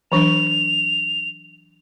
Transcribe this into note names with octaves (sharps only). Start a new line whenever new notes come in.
E3 F#3 D4 F7